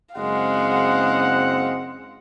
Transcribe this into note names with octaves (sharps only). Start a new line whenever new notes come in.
F#1 G#3 C4 F5 F#5